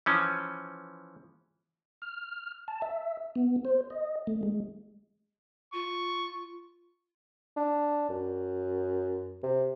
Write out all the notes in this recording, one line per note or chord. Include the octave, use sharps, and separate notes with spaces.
E3 F3 C#4
F6
A5
E5
B3
C5
D#5
A3
G#3
F4 C#6
D4
F#2
C3